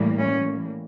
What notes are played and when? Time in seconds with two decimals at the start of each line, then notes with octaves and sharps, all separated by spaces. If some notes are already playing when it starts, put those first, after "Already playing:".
Already playing: A2 E3 G3 A#3
0.19 C#4